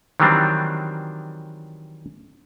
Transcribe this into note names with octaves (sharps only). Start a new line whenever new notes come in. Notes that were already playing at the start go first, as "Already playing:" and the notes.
D#3 E3 F#3 G3 C4 D4